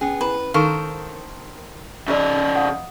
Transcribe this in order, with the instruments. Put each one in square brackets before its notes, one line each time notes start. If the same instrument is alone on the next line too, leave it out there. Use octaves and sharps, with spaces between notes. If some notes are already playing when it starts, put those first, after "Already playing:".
[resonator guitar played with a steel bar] B3 G#4 [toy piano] C#4
[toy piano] E4 A#5 [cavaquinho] B4
[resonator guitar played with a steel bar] D#3 [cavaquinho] A4 A#4 C5 [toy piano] F5 C#6 E6
[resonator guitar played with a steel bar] F2 D#5 [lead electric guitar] C#3 D5
[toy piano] F5 F#5 D#6